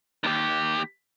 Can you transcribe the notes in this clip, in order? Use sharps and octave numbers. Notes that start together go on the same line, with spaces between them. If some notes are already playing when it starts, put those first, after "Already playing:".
D#2 G4